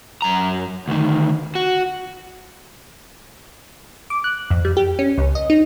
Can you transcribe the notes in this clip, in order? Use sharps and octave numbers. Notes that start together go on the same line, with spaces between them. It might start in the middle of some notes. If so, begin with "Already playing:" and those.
F#2 A#5
D2 D#3
F#4
D6
F#6
F2
G3
G4
C#4
C#2
D#5
D#4